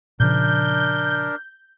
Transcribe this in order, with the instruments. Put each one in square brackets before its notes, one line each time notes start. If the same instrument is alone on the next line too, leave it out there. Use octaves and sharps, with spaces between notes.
[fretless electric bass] A#2 C#3 F3 [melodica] D4 A#4 [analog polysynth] G6